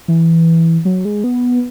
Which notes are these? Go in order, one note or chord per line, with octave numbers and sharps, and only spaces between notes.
E3
F#3
G#3
B3